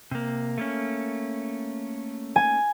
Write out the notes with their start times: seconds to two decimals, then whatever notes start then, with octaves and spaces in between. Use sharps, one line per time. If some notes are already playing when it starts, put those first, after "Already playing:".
0.11 C3 A#3
0.58 A3 A#3 C#4
2.36 G#5